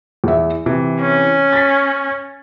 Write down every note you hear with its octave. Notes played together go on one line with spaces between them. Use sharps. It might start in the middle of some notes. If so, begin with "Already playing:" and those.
E2 E5
C3 E3
C#4
A6 B6